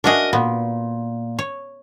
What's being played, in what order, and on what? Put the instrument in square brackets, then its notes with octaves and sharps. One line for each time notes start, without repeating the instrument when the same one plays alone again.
[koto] D4 F#4 G#4 [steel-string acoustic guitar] A#4 D#5
[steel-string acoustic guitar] A#2 [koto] B3
[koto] C#5